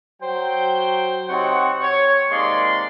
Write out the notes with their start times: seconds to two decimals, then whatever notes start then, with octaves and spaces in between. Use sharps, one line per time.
0.22 F#3 C5 G5
1.28 C3 C4 D#4 C#5 F#5
1.81 C#5
2.30 C3 D#3 G#3 A#3 D5 C6